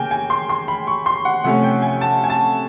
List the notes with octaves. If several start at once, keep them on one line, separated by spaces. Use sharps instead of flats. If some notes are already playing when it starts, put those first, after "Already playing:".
Already playing: C#3 A#3 G5 G#5
G#5
C6
C6
B5
C#6
C6
F#5
C3 F3 A3 C#4 F#5
G5
G#5
A5
G#5
A5